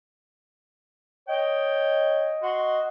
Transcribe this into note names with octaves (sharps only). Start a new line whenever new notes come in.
C#5 D#5 G5
F#4 F#5 C6